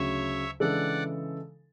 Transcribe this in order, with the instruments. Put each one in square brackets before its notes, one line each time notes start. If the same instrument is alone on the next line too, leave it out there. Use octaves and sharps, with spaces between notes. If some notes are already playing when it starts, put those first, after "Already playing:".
Already playing: [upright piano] D2 C#3 F#3 [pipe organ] C#5 E5
[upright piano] C#3 E3 G#3 D4 A4 [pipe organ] D5 F#5